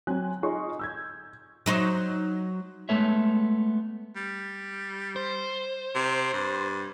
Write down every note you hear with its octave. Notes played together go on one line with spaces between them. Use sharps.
F#3 C4 G#5 F#6
D#4 F4 G#4 D#5 C6 C#6
E6 G6 G#6
F#3 D#4 C5
G#3 A3 B3 A4 C#5 E5
G3
C5
C3
G2